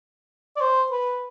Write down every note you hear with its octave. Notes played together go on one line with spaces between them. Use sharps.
D5
C5
B4